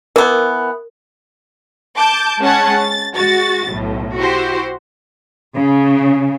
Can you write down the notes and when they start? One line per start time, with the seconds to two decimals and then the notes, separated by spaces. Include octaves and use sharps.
0.16 E3 B3 A#4
1.96 A5 D6 G6
2.41 G#3 C#4 G#4 F#5 A5 G#6
2.75 A6
3.16 G#3 F#4 A6
3.70 B1 A2
4.17 E4 F#4 G4 C5
5.56 C#3